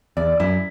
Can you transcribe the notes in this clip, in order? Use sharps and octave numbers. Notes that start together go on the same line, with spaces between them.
E2 D5
F#2 E4